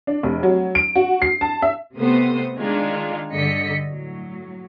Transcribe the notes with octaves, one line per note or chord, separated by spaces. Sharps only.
D4
F1
F#3
D7
F#4
C7
A5
E5
C3 A3 B3 C5 D#6
D#3 G#3 D4 F4 G#4
G2 D3 D#5 B6 C#7
A2 F#3